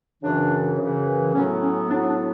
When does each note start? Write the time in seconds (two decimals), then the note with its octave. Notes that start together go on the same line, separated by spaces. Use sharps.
0.23 F#2 C#3 E3 D4
0.78 F#2 C#3 E3
1.34 A2 F#3 B3 C#4
1.61 C#4
1.90 A2 F#3 B3 D4
2.08 D4